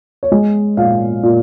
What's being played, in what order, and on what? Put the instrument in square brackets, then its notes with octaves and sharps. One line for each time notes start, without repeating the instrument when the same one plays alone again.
[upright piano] C#5
G#3 D#5
A#2 F5
A#2